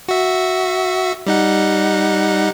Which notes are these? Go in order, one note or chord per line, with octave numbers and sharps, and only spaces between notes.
F#4 E5
G3 D#4 F#5